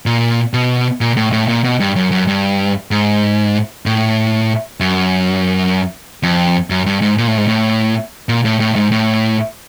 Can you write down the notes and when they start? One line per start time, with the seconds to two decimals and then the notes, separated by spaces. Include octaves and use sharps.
0.06 A#2
0.53 B2
1.01 A#2
1.17 A2
1.32 A2
1.48 A#2
1.64 B2
1.80 G2
1.96 F#2
2.11 F#2
2.27 G2
2.91 G#2
3.86 A2
4.80 F#2
6.23 F2
6.70 F#2
6.86 G2
7.02 G#2
7.18 A#2
7.28 A2
7.37 G#2
7.48 A2
8.29 A#2
8.45 A2
8.60 A2
8.76 G#2
8.92 A2